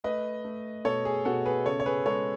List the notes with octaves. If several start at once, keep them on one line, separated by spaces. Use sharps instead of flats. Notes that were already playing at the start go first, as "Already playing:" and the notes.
A3 B4 D#5
A3
B2 A4 C#5
G#4
B2 F#4 A4
G#4 B4
C#3 A4 C#5
C#5
G#4 B4
G#3 A4 C#5